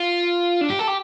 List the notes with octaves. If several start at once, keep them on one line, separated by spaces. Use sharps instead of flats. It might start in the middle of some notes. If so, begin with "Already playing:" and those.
Already playing: F4
D4
G4
A4
G4